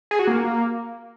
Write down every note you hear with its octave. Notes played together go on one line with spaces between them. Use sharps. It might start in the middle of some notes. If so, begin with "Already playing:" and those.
G#4
F#4
A#3